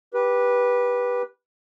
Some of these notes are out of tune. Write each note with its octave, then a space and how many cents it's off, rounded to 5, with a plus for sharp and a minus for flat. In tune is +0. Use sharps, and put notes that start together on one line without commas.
G4 +0 B4 -15